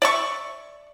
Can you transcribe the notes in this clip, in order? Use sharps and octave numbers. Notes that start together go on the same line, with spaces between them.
D5 E5 C#6